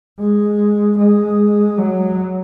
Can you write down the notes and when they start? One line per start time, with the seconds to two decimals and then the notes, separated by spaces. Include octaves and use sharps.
0.20 G#3
0.99 G#3
1.78 F#3